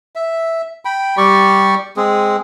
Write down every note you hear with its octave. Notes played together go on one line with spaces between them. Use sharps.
E5
G5 B5
G3 G4 D5 C#6
G#3 C4 G#4